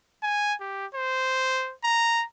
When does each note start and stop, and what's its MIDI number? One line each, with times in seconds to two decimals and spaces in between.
0.23 0.54 80
0.60 0.86 67
0.95 1.73 72
1.84 2.24 82